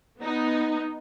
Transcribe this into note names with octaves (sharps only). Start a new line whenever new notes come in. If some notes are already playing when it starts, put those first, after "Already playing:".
B3 D#4